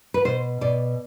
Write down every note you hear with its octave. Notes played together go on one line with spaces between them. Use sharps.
B4
B2 C5
B2 D5